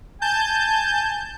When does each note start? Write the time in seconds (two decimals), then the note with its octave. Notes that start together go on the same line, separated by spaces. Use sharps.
0.22 G#5 A5 G6